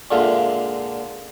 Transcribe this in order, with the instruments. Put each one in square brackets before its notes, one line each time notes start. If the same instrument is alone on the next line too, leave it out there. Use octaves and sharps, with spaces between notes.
[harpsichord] A#2 D3 G#3 F4 E5 F5